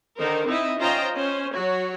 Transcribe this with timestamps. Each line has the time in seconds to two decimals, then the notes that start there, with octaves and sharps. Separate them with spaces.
0.18 D3 D#3 D#4 A#4 C5
0.47 C4 D#4 E4 D#5 E5
0.79 C#4 F4 C5 D#5 G5 A#5
1.13 C#4 C5
1.53 F#3 F#4 C#5